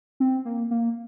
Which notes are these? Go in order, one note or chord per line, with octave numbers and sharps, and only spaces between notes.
C4
A#3
A#3